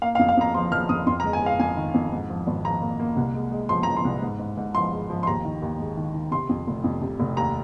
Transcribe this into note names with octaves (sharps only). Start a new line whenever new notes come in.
A#3 F5
F5
F2
F5
F2 A#5
F3 C6
F3 F6
F2 D#6
F2 C6
A#5
G#3
G#5
G#3 F5
F2 G#5
D#3
F2
G#2
F3
G#1
F3 A#5
A#3
A#3
C2
G#3
G#3
F3 C6
F3 A#5
C6
C2
G#2
G#2
G#2
F3 C6
G#3
F3
C6
D#2 A#5
D#3
D#2
G#3
D#3
D#3
C3 C6
F2
F1
F2
C3
F1
D#2 A#5